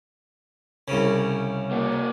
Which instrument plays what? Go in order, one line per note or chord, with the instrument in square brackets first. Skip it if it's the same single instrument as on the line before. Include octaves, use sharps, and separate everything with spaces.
[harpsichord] C2 C#3
[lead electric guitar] A#3 F#4